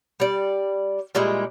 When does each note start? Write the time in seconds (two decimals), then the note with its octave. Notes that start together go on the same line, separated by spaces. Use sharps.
0.20 G3 D5
1.15 A#2 G3 G#3 E4